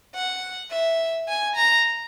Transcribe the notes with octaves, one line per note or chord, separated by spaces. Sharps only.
F#5
E5
G#5
A#5